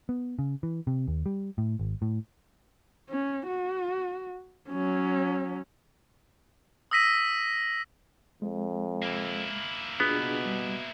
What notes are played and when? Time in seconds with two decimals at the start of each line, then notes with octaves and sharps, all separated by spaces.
0.09 B3
0.39 C#3
0.63 E3
0.87 C3
1.08 D#2
1.26 G3
1.58 A2
1.79 G#1
2.02 A2
3.10 C#4
3.47 F#4
4.69 F#3 C#4
6.91 D#6 E6 A#6 B6 D#7
8.42 F2 G#3
9.02 A#3 E4
10.00 B2 B3 D4 F4 G#4
10.45 G3